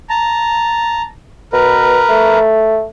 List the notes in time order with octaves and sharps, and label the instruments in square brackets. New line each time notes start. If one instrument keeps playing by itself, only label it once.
[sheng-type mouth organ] A5 A#5
[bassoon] B2 [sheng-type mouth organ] A#4 B4
[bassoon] A3